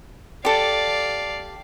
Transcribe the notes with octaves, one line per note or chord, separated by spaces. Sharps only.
G4 A4 D5 F5